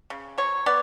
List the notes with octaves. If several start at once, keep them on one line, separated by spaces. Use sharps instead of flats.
C#3
F#3 C#5
B3 D5